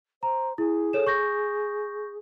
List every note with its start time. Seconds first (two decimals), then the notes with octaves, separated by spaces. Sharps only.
0.23 C5 A#5
0.58 E4 G#4
0.93 A4 C#5 E7
1.07 C#6 G6 A#6